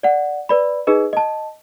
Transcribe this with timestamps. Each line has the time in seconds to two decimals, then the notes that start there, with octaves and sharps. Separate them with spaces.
0.03 D5 F#5
0.49 B4 D5 B5
0.87 D#4 G#4 B4 D#5
1.13 D#5 A5